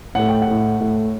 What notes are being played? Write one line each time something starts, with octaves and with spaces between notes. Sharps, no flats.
A2 A3 F#5
G5
F#5
A2 A3
A2 A3